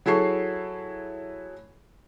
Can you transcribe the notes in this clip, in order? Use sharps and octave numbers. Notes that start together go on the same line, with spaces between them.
F#3 E4 G#4 A4 C#6 C7